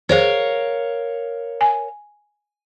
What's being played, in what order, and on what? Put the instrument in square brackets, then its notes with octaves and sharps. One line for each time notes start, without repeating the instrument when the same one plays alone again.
[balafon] G#4 C5 [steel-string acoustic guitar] A#4 C#5 F5
[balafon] G#5